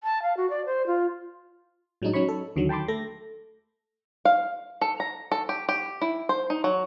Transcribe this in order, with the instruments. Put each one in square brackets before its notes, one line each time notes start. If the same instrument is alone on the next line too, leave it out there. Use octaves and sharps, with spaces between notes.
[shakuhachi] A5
F5
F#4
D5
C5
F4
[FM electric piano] A2 F#3 G#3 D4 D#4
F#3 C#4 D#4 C#5 B5 C#6
A4
D#2 D3 D#3 F#3
G5 A5 B5 C6 D6
A3 A4 A#6
[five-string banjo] F5
A4
A#5
A4
G4
G4
E4
C5
D#4
F#3